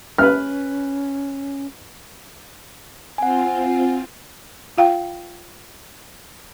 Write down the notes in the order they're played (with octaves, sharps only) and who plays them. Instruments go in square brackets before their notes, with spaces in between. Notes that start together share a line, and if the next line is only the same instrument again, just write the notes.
[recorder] C#4 [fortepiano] B4 F6
[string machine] C4 F4 [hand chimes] F#5 G#5
[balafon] F4 F5 G5